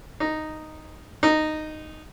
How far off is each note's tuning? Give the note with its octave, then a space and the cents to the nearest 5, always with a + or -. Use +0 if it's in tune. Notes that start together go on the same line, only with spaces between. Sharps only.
D#4 -5
D#4 -10